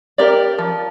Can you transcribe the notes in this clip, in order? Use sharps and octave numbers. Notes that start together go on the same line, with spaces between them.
G4 A#4 D5
F3